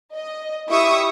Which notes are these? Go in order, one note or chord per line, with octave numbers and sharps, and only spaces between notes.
D#5
E4 G4 E5 C#6 D#6